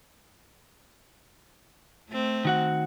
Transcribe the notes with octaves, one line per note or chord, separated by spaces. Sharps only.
A3 C4
D#3 F#4 F#5